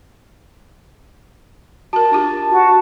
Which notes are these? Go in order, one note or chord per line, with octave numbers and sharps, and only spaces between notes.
F#4 A#4 A5
D4 F4 G4
F#4